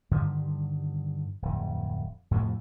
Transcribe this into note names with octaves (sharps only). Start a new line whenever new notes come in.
G2 D3 D#3 G3
D1 F2
F2 A2 C3 F3